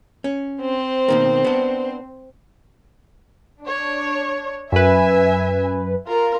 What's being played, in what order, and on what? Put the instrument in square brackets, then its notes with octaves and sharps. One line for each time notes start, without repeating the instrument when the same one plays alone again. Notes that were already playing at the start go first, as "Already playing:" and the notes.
[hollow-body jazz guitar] C#4
[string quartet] C4 C5
[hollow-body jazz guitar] B2 D#3 A#3
B3 D4
[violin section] D4 C#5
[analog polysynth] F#2 B4 [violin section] E5 G#5
[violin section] F4 A#4